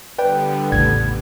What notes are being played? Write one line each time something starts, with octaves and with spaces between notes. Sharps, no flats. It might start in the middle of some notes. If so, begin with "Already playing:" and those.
D3 G3 B3 B4 D5 G5
A1 E2 A2 C#3 G#6